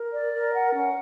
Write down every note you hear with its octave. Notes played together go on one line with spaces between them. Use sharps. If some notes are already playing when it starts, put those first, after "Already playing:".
Already playing: A#4
D5
A#4
F#5
C#4